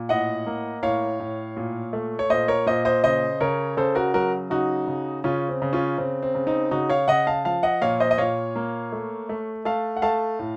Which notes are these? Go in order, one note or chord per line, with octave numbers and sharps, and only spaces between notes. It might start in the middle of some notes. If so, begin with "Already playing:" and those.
Already playing: A#2
A2 D#5 F#5
A#3
A2 C#5 F5
A2
A#2
A3
C#5
A#2 C5 D#5
A#4 C#5
A#2 C5 D#5
C5 D#5
C#3 C5 D#5
C#3 A#4 C#5
C#3 A4 C5
F#4 A#4
F#3 F#4 A#4
C#3 D#4 F#4
C#3
C#3 C#4 F4
C4
C#3
C#4 F4
C#3 C4
C4
C#3
C4 D#4
C#3 D#4 F#4
C#5 F5
C#3 D#5 F#5
F5 A5
F3 F5 A5
D#5 F#5
A#2 C#5 F5
C5 D#5
D#5
A#2 C#5 F5
A#3
A3
A3
A3 F5 A5
F#5
A3 F5 A5
A2